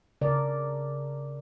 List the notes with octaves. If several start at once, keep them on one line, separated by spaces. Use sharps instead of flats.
C#3 A#4 D5